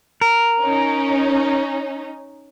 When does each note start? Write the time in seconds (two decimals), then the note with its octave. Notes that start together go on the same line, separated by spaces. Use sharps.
0.21 A#4
0.62 C#4 D#4